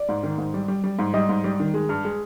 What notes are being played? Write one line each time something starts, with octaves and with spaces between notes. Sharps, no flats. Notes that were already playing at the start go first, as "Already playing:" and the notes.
Already playing: D5
G#2
D#3
G#2
G3
G3
G3
G#2
G3 D#5
G#2
G3
D#3
G#3
G2
G#3